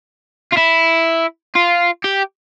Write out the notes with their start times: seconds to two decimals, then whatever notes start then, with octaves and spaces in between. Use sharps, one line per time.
0.53 F4
0.58 E4
1.55 F4
2.04 G4